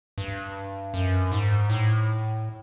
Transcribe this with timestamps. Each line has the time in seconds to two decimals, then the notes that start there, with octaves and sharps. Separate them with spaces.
0.18 G2
0.94 F#2
1.32 G#2
1.70 A2